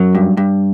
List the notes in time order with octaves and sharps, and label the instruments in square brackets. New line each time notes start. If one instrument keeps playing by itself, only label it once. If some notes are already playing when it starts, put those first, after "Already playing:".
Already playing: [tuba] F#2 [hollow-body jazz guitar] F#3
[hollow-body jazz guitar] G2
G2